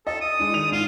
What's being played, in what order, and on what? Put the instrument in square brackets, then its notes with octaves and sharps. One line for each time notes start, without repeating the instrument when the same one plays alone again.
[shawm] A4 [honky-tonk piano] D#5
[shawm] D#6
[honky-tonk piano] G#3 D4
D#3 F7
[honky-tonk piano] G#2 [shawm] F4